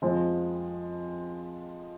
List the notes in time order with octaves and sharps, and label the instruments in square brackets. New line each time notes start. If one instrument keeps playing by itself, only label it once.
[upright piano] F2 F3 G#3